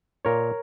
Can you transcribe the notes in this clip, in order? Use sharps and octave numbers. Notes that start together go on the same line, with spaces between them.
A#2 A#4 C#5